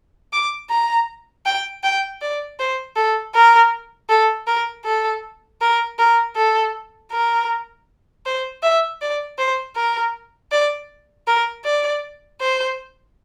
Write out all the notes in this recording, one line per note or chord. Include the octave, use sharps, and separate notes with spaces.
D6
A#5
G5
G5
D5
C5
A4
A#4
A4
A#4
A4
A#4
A#4
A4
A#4
C5
E5
D5
C5
A#4
D5
A#4
D5
C5